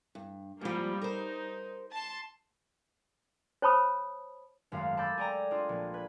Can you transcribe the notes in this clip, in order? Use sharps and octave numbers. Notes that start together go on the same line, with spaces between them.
G2
G#2 F3 G3 A#3
D#4 A#4 C5
A5 C6
C5 C#5 A5 B5 D#6
G#1 F#2 A3 F5
A5 B5 D6 E6 G6 A6
G#4 A4 D5 G5 G#5 A#5
D4 F4 D#6
A#1
B4 G#6